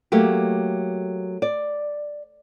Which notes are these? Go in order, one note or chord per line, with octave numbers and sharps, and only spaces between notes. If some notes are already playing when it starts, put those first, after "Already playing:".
F#3 A3 A#3 G4
D5